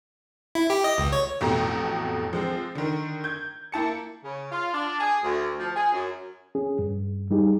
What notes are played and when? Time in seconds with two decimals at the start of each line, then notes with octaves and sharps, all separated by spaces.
0.55 E4
0.70 G4
0.84 D#5
0.98 C#2
1.12 C#5
1.41 A1 F2 B2 A3 G4 A#5
2.33 F3 G#3 C4
2.75 D3 D#3
3.24 G6 G#6
3.72 A#3 E4 A5 C#7
4.24 C#3
4.51 F4
4.73 D4
5.00 G#4
5.23 D2
5.59 F3
5.76 G#4
5.93 F#2
6.55 C#4 G#4
6.79 G2
7.31 G3 D#4 G4 G#4